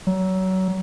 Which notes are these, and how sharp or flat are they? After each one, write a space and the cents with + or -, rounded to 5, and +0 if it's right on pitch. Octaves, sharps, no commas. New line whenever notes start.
F#3 +25